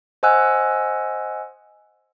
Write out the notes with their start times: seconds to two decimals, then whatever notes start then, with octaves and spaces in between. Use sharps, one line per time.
0.23 C5 D#5 F#5 G#5 E6 F#6